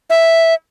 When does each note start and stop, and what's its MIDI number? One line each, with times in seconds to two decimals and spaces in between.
0.10 0.54 76